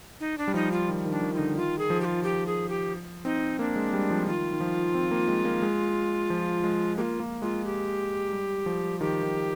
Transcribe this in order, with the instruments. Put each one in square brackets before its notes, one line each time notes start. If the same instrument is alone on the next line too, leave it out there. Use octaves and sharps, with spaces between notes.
[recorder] D#4
D4
[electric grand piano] G3
[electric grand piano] F3 [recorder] D#4
[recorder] F4
[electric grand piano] D#3
D#3
[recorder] D4
[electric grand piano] D#3
[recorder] F4
[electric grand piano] D3 [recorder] D#4
[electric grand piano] D#3 [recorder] F4
[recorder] G#4
[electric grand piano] F3
[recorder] G4
F4
G4
G#4
G4
[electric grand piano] C4 [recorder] D#4
[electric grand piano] A#3 [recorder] D4
[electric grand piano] G#3
G3
F3
[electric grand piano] D#3 [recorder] F4
[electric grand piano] D#3
F3
C4
A#3
G#3
A#3
G#3
F3
G#3
[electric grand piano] A#3 [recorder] F4 G4
[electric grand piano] A#3
[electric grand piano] G#3 [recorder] F4
[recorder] G4
[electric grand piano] G3
F3
[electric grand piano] D#3 [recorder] G4
[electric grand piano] D#3